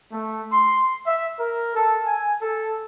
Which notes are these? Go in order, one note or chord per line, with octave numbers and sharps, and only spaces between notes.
A3
C6
E5
A#4
A4
G#5
A4